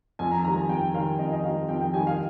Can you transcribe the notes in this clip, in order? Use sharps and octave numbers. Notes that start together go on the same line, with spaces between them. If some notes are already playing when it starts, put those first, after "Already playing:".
F2 G#5
A#5
D#3 G3 A#5
G#5
F2 G5
D#3 G3 F5
F2 D#5
D#5
D#3 G3 F5
F2 G5
G5
D#3 G3 G#5
F5